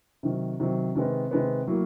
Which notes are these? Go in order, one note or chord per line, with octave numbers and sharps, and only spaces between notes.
C3 D#3 F#3
C3 D#3 F#3
C3 D#3 G#3 B3
C3 D#3 G#3 B3
A2 F#3 A#3